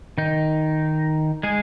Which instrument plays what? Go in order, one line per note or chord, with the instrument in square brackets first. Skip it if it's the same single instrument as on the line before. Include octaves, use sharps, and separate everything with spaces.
[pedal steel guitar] D#3 D#4
G#3 G#4